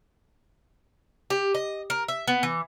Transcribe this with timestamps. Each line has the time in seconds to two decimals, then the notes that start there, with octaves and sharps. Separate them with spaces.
1.30 G4
1.55 D#5
1.90 A#4
2.08 E5
2.28 B3
2.43 E3